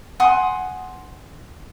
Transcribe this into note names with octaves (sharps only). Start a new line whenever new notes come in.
F#5 G#5 C6 D#6